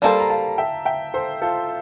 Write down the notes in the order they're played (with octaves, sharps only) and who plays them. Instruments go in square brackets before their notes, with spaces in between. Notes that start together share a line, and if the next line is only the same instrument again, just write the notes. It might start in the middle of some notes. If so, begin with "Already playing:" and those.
[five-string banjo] G3 A#3 E4 A4 C5 [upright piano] F5 A5
[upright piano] A#5
F5 A5
E5 G5
E5 G5
A4 C5
F4 A4